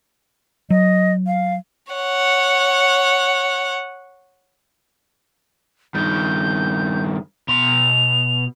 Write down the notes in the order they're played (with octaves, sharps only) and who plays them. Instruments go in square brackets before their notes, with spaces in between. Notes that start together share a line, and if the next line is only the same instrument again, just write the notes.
[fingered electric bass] F#3 [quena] D#5
[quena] F5
[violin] C#5 F#5
[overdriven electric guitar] G2 D#3 [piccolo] G6
[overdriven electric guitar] B2 C6 [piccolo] F7